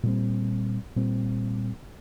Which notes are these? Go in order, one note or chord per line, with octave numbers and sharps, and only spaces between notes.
A#2 G3 C4
A#2 G3 C4